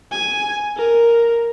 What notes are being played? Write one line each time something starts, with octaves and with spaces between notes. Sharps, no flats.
G#5
A#4